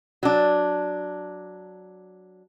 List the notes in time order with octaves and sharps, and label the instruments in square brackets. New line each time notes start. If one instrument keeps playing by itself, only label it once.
[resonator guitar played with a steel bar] F#3 D4